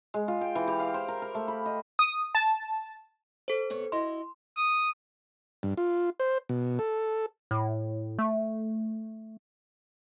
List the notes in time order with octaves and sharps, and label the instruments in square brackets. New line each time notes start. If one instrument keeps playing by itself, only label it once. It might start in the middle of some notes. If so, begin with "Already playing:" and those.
[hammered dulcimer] G#3
F4
G5
E3
G4
F5
C5
A#4
A#4
A3
B5
D#5
[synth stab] D#6
A5
[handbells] A4 C5
[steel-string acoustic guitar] C3 B3 C#5
[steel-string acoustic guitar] E4 F#4 D#5 [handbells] C6
[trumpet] D#6
[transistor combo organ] G2
F4
C5
B2
A4
[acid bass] A2
A3